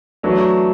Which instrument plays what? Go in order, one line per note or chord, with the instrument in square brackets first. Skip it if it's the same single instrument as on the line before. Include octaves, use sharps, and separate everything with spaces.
[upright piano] E3 A3 D4 [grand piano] F#3